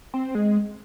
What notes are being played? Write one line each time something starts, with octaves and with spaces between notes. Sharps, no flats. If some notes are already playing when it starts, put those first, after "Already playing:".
C4
G#3